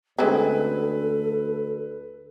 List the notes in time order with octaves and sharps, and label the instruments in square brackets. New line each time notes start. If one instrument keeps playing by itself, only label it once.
[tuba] D2 [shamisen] G#3 C4 C#4 [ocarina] A4 [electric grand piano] B4